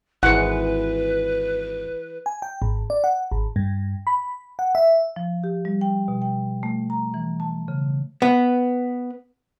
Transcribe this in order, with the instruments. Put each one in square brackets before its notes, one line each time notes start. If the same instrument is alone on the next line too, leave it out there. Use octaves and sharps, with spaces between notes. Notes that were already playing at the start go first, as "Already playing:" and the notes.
[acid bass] G#1 [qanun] E3 G#3 [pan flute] B4 [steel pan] F#5
[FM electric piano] G#5
G5
G#1
D5
F#5
G#1
G2
B5
F#5
E5
[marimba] F3
G4
G3
G5
B2
G5
A3
A#5
E3
A5
C#3
[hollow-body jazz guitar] B3